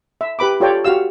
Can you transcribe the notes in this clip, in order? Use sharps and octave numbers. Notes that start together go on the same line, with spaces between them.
E5
G4 B4 B5 D6
F4 G4 A4 C#5 D5 G5
F#4 G4 F5 E6